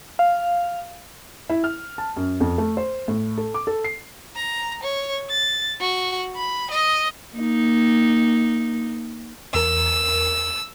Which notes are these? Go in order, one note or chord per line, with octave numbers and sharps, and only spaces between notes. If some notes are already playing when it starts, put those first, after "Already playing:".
F5
E4
F6
A5
F#2
F2
A3
C5
A2
A4
D6
A4
C7
A#5
C#5
A6
F#4
B5
D#5
A#3 D#4
E2 A#4 E6